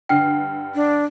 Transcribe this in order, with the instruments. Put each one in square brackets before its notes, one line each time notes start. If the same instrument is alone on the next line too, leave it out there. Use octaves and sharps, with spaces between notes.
[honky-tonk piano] G2 D3 C7 [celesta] G5 F6
[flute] D4